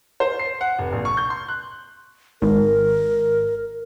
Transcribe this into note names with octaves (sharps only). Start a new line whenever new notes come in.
C5
C7
F#5
F1
A#1
C#6
G6
C6
F#6
G#1 A#4